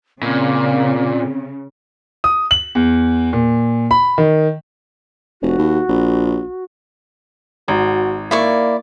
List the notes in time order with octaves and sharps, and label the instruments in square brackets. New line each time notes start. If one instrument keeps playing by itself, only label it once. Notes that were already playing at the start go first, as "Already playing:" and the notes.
[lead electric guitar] A#2 [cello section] C#3 [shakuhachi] C4
[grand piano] D#6
F#7
E2
A#2
B5
D#3
[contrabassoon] F1 [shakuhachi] F#4
[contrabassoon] D#2
A#1
[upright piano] G#1 [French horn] F#4
[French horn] A#3 [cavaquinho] E4 D5 C#6